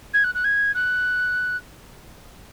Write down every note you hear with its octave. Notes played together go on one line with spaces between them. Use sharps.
G#6
F#6
F#6
G#6
F#6